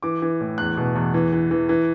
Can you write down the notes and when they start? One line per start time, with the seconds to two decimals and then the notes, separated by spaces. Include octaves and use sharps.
0.03 E3 D6
0.22 E3
0.41 A2
0.58 E2 F#6
0.77 B2
0.95 E2
1.14 E3
1.32 E3
1.51 E3
1.69 E3